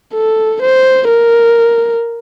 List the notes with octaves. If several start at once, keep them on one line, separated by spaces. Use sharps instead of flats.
A4
C5
A#4